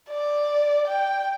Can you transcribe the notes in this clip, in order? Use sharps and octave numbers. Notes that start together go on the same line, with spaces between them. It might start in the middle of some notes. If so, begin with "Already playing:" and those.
D5
G5